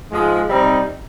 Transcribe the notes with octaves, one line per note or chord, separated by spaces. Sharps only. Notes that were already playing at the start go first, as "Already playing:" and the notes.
G#2 F3 G#3
C3 G3 C4 D#4